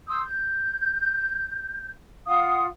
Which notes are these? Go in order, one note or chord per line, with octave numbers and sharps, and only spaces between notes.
C6 D#6 E6 G6
G6
F4 F5 F#5 D#6